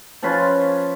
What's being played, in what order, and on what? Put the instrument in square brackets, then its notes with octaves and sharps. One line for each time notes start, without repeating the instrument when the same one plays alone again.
[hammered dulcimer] F3 C#4 F4 B4